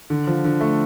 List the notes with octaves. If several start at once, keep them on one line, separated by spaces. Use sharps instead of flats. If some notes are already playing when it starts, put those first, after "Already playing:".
D3
F3
D3
A3